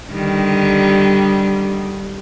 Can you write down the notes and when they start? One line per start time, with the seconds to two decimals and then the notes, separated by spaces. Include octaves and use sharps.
0.12 D3 D#3 G3